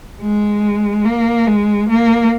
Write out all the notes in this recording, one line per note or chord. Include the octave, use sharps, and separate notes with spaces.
G#3
A#3
G#3
A#3